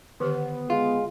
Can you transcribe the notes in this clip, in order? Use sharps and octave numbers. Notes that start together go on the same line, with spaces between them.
D3 D#3 B3 G4
G#3 F4